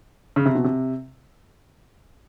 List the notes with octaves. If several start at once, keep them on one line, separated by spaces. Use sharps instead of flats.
C#3
C3
B2
C3